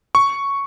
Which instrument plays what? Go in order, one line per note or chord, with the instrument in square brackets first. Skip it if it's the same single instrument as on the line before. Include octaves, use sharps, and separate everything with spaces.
[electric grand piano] C#6